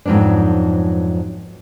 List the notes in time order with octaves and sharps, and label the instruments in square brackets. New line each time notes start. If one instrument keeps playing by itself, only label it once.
[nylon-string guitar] F2 G#2 F#3 B3 D4